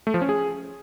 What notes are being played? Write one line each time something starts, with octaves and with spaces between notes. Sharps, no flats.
A3
F3
C#4
G#4